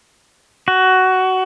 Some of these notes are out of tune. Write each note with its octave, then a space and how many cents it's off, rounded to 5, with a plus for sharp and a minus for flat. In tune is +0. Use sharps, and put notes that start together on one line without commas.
F#4 +15